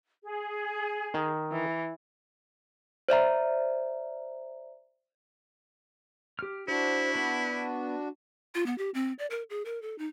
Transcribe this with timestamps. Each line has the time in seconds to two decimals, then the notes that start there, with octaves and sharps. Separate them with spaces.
0.23 G#4
1.14 D#3
1.52 E3
3.09 C5 D5 E5 A#5
6.39 G4 F6
6.68 D4 E4 F#4 C5
7.15 B3 B5
8.55 F4
8.66 B3
8.78 G4
8.94 C4
9.19 D5
9.30 A#4
9.50 G#4
9.65 A#4
9.82 A4
9.98 D#4